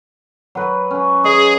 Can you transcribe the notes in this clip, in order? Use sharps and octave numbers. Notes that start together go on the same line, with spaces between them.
F#3 B4
C#4
G#4 D#5